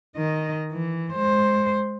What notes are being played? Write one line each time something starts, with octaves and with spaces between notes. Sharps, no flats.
D#3 D#5
E3
G#3 C5